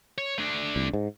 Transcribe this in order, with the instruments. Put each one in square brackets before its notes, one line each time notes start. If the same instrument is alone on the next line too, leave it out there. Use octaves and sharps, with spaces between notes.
[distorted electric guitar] C#5
A3 D4
[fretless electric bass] C2
G#2